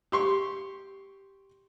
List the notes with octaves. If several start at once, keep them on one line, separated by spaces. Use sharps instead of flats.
G4 C6 C#6